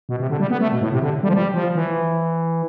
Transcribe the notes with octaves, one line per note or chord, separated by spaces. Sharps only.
B2
C3
D3
G3
B3
A3
B2
A2
C3
D3
G3
F3
G3
F3
E3